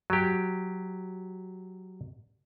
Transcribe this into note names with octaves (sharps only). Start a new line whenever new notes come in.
F#3 G4